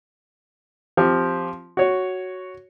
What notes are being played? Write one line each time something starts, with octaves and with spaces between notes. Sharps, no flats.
F3 C4 G4
F#4 C#5